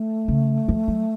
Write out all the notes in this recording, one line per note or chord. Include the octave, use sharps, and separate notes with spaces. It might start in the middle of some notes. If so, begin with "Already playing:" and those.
Already playing: A3
C#3
F3
F#3